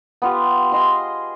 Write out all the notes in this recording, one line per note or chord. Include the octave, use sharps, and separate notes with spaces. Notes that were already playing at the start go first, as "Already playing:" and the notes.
B3 F4 G4
G#4 D#5 C6